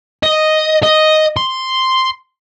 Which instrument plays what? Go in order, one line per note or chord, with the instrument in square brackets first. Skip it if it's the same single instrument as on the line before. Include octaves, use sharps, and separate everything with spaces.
[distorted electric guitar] D#5
D#5
C6